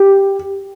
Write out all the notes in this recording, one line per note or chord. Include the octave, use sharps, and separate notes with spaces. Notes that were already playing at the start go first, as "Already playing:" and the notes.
Already playing: G4